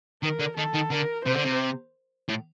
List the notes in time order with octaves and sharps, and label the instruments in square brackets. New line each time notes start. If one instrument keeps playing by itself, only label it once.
[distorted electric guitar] D#3 [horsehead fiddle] A#4
[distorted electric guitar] D3
[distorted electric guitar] D#3 [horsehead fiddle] A4
[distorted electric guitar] D#3
[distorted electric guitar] D3 [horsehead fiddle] A#4
[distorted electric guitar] C3 [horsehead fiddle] C5
[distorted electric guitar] D3
C3
A2